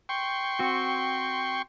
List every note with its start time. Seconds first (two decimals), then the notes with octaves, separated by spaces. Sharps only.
0.09 G5 C6 C#6
0.59 C4 F#4